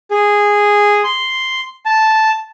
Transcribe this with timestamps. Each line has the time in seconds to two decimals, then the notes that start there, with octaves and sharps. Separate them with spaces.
0.11 G#4
1.04 C6
1.86 A5